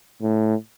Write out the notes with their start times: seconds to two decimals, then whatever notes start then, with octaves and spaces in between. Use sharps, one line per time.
0.22 A2